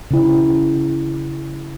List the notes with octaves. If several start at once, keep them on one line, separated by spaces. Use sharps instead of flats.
C#3 E4